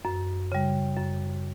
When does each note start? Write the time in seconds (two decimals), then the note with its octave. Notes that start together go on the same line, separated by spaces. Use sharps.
0.05 F#2
0.52 C#3 G3
0.97 F#2